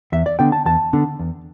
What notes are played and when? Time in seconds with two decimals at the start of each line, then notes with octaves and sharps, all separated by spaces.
0.12 E2 E5
0.26 D5
0.39 D3 B3 D4 G5
0.52 A5
0.65 E2 A5
0.93 D3 B3 D4
1.19 E2